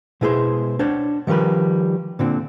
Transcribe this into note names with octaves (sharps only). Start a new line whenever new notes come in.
B2 G#3 E4 G#4 C5
D4 C5 C#5 F#5
D#3 F3 G3 A#4 B4
A#2 D3 C4